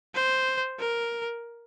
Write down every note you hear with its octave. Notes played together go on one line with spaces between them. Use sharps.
C5
A#4